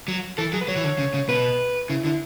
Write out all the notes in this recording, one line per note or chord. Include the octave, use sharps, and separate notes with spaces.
F#3
E3 A4
F#3 G#4
B4
F#3 C#5
E3
D3
C#3
C#3
B2 B4
C#3 E4
D3 E4